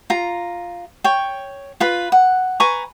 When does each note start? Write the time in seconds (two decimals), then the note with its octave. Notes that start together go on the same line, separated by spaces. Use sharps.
0.10 F4 A#5
1.04 C#5 G5
1.80 F4 B4 B5
2.12 F#5
2.60 B4 G#5 A#5 C#6